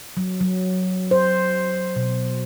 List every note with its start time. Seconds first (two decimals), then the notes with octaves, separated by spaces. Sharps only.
0.17 F#3
0.40 F#3
1.11 C5
1.96 B2